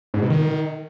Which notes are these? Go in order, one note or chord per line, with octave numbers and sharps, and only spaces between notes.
G#2
B2
D#3